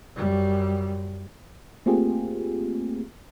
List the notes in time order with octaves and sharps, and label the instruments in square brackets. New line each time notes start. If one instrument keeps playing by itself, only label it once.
[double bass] F#2 G3
[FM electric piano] A3 A#3 C4 F4 G4 G#4